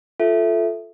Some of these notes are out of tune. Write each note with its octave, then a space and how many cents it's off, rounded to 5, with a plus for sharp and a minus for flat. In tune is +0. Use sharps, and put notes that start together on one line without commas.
F4 +0 A4 +0 E5 +0